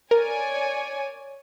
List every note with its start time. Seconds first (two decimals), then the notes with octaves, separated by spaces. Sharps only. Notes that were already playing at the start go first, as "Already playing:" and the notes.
0.11 A#4 C#5 D5 G#5